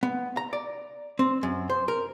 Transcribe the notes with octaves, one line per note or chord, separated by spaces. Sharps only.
B3
A#5
D5
C4
F#2
C5
A#4